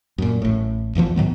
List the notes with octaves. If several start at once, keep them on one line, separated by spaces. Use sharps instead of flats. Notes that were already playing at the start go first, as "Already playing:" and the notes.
F#2 A#2
A1 A2
B1 E2 E3 F3
G#2 D#3 F#3 B3